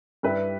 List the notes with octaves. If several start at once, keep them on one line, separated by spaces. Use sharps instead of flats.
G2 G3 E4 G4 B4